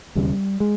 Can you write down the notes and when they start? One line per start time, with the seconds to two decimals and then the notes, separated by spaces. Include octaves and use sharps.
0.15 E1 D#2 C#3 G3
0.60 G#3